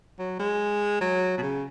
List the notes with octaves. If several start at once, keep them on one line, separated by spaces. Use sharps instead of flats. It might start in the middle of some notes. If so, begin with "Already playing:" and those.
F#3
G#3
F#3
B2
C#3